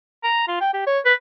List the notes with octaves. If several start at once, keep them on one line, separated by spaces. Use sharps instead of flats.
A#5
F4
G5
G4
C#5
B4